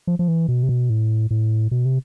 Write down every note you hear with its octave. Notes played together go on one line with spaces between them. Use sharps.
F3
F3
E3
B2
C3
B2
A2
A2
B2
C3